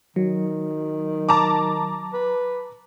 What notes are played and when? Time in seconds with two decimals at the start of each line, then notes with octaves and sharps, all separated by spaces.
0.16 D#3 F#3
1.29 A5 A#5 D6
2.13 B4